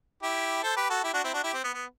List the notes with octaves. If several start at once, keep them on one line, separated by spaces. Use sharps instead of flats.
E4 G4
A4 C5
G4 B4
F#4 A4
E4 G4
D4 F#4
C4 E4
D4 F#4
E4 G4
C4
B3
B3